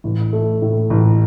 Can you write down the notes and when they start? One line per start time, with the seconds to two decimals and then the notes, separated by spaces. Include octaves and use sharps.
0.04 A1
0.33 A3
0.62 A2
0.90 A1